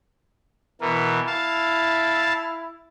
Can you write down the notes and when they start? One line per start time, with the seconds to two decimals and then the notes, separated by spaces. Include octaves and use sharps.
0.81 B2 E3 A#4
1.27 E4 F5 A5